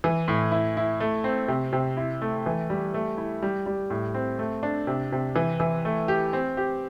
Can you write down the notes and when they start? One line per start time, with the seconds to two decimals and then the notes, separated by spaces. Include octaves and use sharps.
0.04 E3
0.28 A2
0.51 E4
0.77 E4
1.00 A3
1.24 C4
1.48 C3
1.73 C3
1.97 E4
2.22 A3
2.46 E3
2.70 G3
2.94 A3
3.18 E4
3.42 G3
3.66 G3
3.90 A2
4.14 C4
4.39 A3
4.63 D4
4.87 C3
5.12 C3
5.36 E3
5.60 E3
5.85 A3
6.08 G4
6.33 C4
6.57 G4